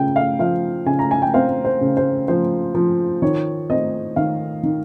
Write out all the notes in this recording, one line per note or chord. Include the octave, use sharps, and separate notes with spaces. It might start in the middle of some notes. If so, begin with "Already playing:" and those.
Already playing: C#3 F3 G5
F5
F3 F5
C#3 G#5
A#5
G#5
G5
C4 F5
C5
C#3
C5
F3 C5
F3
D#3 C#5
C4 D#5
D#3 F5
D#3